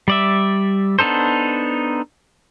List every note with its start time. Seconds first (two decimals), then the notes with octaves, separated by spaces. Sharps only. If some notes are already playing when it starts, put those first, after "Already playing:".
0.08 G3 D5 E5
0.99 B3 D4 D#4 A4 C5